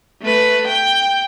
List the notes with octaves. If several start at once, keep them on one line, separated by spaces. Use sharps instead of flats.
A3 B4
G5